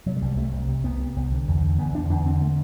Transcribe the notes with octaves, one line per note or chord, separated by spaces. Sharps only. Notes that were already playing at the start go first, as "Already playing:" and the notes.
C3 F#3
G3
C2
G3
C3 A3
C2
C3
C2 B3
C3
C2
D3
E2
D3
E2 B3
D3 D4
E2 D4
D3 C4
A3